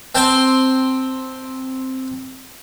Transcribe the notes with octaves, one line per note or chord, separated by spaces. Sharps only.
C4 G5 A5 C6